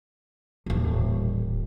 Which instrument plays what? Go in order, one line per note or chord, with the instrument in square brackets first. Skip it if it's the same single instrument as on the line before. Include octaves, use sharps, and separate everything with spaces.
[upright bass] D#1 A1